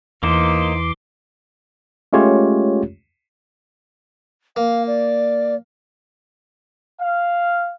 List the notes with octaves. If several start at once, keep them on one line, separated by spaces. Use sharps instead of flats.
E2 E3 A#3 D#4 C5 C6 D6
G#3 A3 C#4 F4 G4 C#5
A#3 F5
D5
F5